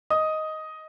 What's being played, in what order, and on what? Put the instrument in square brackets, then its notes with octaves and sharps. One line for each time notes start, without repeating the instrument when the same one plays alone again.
[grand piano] D#5 D#6